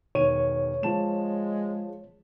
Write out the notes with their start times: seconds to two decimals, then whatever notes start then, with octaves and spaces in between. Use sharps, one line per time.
0.15 E1 D#3 C#5 D#7
0.83 F3 G#3 A5 E7